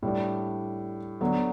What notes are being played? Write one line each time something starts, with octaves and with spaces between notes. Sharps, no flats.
A2 G3 D4
D3 F#3 B3